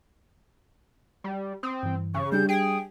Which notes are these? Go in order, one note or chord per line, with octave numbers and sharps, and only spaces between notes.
G3
C4 D#6
G2 E3
C#3 C#6
G3 D4 G4 G6
G#4 G5